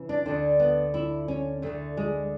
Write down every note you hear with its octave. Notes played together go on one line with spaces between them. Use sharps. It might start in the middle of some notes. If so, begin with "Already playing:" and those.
Already playing: C#3 E3
D4
D2 D3 D4
B3
E4
C#4
D2 D3 A3
G#3